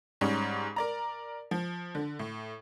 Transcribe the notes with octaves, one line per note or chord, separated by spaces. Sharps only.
G#2 G3 C#4
A#4 D5 A#5
F3
D3
A2